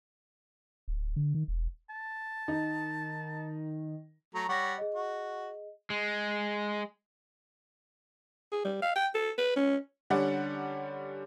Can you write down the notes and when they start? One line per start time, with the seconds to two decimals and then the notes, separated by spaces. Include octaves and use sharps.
0.88 D1
1.16 D3
1.34 D#3
1.48 E1
1.90 A5
2.48 D#3 D#4
4.35 F#3 A3 A#5
4.49 G3 C#5 F#5 C#6 A#6
4.78 G#4 D#5
4.94 F#4
5.90 G#3
8.52 G#4
8.65 G3
8.82 F5
8.96 G5
9.14 A4
9.38 B4
9.56 C#4
10.10 D3 G3 C#4 D5 F#5